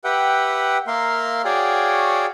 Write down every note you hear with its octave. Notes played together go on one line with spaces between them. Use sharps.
G4 B4 E5 F#5 G5
A#3 A#4 E5 F5 C6
F#4 G#4 C#5 D5 F5 G5